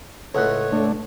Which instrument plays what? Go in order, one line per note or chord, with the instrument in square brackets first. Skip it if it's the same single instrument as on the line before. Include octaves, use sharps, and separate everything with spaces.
[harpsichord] C#2 A2 [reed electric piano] A4 F#5 F#6 [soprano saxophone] C#5
[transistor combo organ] A3 D4